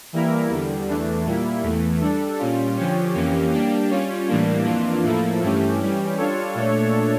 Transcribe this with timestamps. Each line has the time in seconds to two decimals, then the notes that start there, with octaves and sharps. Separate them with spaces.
0.13 E3 G3 A#3 E4 A#4
0.49 E2 D3 G3
0.87 E2 E3 A3 D4
1.25 A#2 G3 A#3 E4
1.63 E2 E3 A3
2.01 G3 D4 A4
2.39 A#2 G3 C#4 F4
2.77 D3 F3 C#4 G4 C#5
3.14 F2 E3 A#3 C#4 G4
3.53 G3 A#3 D4 G4
3.90 G3 C#4 F4 C#5
4.28 A2 E3 G3 A#3 D4
4.65 F2 E3 A#3 D4 F4
5.03 A2 F3 A#3 E4 A4
5.41 G2 E3 A3 C#4 G4
5.79 E3 G3 C#4 G4
6.17 G3 D4 F4 A4 C#5
6.55 A#2 A3 D4 A4 C#5